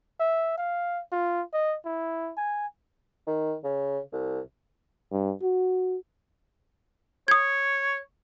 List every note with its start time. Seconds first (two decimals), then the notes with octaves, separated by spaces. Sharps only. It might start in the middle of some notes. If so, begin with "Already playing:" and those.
0.20 E5
0.58 F5
1.12 F4
1.53 D#5
1.85 E4
2.37 G#5
3.27 D#3
3.64 C#3
4.12 C2
5.12 G2
5.42 F#4
7.28 C#5 D#6 G#6